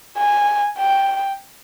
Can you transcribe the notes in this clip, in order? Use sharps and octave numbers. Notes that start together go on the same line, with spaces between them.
G#5
G5